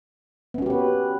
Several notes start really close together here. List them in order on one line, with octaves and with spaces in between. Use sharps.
B3 C#4 F#4 G4 B4